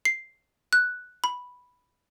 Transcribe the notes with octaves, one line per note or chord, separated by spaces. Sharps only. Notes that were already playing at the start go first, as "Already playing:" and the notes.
C7
F#6
B5